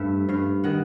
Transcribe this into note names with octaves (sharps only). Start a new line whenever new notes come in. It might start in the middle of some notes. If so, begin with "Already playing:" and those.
Already playing: G2 A3 E5
G2 F5
D#3 F#5